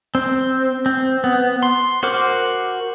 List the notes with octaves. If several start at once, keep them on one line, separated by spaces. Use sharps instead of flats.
C4
C4
B3
C6
F#4 A#4 C5 D6